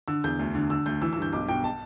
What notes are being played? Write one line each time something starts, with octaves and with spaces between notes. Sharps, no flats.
D3 E6
E2 G6
D2
D3
D3 E6
D2 G6
E3 E6
E6
G2
G6
B1 D6
B2 G5
A5